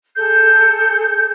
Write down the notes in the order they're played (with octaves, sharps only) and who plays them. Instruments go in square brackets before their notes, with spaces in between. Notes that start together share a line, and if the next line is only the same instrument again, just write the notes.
[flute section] G#4 A4 G6